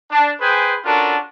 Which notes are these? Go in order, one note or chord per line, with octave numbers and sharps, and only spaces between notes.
D4 A5
G#4 B4 C5 G5 G#5
C#4 D4 F4 F#4 A4 A#4